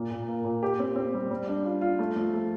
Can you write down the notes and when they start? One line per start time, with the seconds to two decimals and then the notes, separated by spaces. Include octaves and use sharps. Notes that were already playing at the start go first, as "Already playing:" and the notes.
Already playing: A#2
0.11 A#2
0.28 A#3
0.45 A#2
0.63 G4
0.79 C4
0.96 C4
1.14 G3
1.31 G3
1.48 D4
1.64 F4
1.81 F4
1.99 A3
2.16 F3
2.34 A3